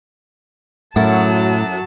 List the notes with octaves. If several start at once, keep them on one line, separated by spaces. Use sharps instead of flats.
F#2 A2 F#3 E4 A4 A5